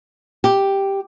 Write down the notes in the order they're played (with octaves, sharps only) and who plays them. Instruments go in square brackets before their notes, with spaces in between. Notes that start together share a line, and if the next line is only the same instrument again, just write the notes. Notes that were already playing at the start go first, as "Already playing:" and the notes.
[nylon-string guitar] G4